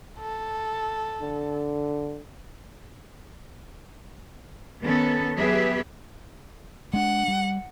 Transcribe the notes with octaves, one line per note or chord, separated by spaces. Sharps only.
A4
D3
D#3 B3 C#4 A4
F#3 B3 G4 G#4 B4 E5
G#3 D4 F#5
G3